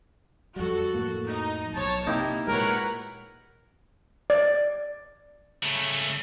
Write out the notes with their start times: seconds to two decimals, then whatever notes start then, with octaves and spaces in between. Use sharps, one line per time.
0.56 F2 G3 F#4 A4
0.94 F2 A2 A#3
1.26 D#4
1.73 B1 C#5 A5
2.07 C3 A#3 D#4 E4 G4
2.48 A#2 G#3 A#4 B4 C#5 F#5
4.30 D5
5.63 C#3 A3